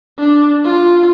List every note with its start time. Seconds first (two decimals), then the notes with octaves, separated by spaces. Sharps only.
0.19 D4
0.65 F4